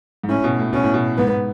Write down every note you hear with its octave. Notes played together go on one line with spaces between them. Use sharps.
G#2
A2 C#4
B2
A2
B2 C#4
A2
B2
G#2 B3